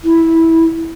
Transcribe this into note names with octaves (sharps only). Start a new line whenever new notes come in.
E4